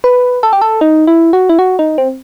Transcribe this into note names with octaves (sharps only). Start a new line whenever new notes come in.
B4
A4
G4
A4
D#4
E4
F#4
E4
F#4
D#4
C4